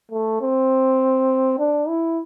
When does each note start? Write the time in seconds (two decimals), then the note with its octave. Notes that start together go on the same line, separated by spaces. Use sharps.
0.12 A3
0.41 C4
1.59 D4
1.88 E4